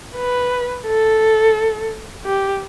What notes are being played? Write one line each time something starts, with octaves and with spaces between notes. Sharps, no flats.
B4
A4
G4